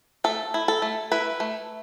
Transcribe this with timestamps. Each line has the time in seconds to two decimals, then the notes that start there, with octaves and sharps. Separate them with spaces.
0.24 A3 A4
0.54 E4
0.68 A4
0.82 A3
1.12 E4 B4
1.40 A3